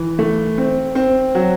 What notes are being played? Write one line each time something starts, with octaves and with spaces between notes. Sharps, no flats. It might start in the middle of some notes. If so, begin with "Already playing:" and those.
Already playing: E3
A3
C4
C4
F#3